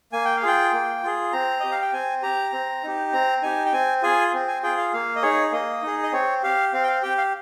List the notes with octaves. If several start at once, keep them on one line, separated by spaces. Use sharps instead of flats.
A#3 G#5
G5
F5
F4 G#4 G5
A#3
F4 G#4
C4 A#5
G4 D#5
F5
G5
C4 G#5
G4 A#5
C4
D#4 G4
C4 A#5
D#4 G4 G#5
G5
C4 G#5
F4 G#4 G#5
C4
G#5
F4 G#4 G5
F5
A#3 F5
D#5
D#4 G#4 C#5
A#3 D#5
D#4 G#4
D#5
C4 C#5
G4 F5
C4 F5
G5
F5
G4 G5
F5